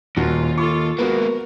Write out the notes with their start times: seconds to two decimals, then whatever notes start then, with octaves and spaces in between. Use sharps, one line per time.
0.17 D#1 D#2 F4 F#4
0.58 F4 A4 C#6 D6 C#7
0.99 G#3 A#3 B3 F#4 A#4